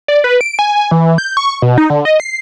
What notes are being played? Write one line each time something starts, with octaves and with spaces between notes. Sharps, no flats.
D5
B4
D7
G#5
E3
G6
C#6
B2
D#4
D3
D#5
C7